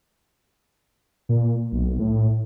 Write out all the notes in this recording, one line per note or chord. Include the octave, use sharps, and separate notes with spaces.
A#2
B1
A2